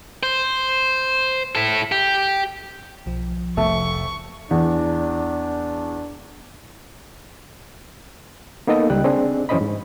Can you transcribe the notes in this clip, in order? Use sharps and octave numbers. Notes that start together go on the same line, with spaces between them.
C5
E4 A4
G4
B1 F3
F1 A3 C#6
E2 D4
A#3 B3 D#4 A4 D#5
C#2 G3 G5 F#6
C4 D4 G#4 D5
F#2 E3 C#4 C5 D#5 B5
G#2